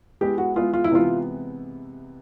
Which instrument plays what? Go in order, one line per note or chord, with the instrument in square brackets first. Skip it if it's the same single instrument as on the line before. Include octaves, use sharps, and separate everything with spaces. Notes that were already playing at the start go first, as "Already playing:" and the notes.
[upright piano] G#3 B3 E4 G#4 [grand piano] G4
[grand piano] F#4
[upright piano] G#3 B3 E4 G#4 [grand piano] F4
[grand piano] F4
E4
[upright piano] C3 E3 G#3 B3 [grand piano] F4